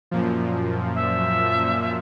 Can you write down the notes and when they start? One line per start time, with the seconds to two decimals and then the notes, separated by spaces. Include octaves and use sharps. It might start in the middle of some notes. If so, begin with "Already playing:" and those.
0.11 F#2 A#2 F3
0.95 E5